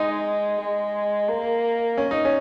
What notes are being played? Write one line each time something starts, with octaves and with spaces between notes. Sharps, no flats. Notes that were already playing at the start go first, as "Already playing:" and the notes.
Already playing: G#3 D#4
G#3
A#3
C#4
D#4
C#4